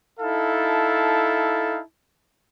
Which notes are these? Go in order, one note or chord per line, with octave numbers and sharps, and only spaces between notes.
D#4 E4 A4 F5 A5